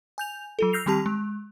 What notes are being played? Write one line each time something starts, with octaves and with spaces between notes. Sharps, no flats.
G#5 G6 F7
F#3 F4 A4
E6 F6 G6 A#6 C7 F7
D#3 G3 C4 G4 A5 F7
G#3